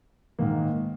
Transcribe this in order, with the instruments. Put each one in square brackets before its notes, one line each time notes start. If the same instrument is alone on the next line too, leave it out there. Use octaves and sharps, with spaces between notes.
[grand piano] G#2 D#3 A#3